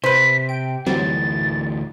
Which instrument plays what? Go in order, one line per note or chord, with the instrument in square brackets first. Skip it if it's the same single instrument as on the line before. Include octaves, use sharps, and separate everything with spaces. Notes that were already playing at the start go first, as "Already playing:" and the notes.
[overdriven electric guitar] C3 [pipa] B4 C5 [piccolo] B6
[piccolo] G5 [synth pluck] D7
[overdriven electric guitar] D2 E3 [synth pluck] F#3 G3 C4 [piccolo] A6